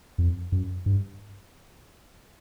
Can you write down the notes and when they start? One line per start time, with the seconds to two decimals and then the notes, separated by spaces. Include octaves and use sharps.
0.18 F2
0.52 F#2
0.86 G2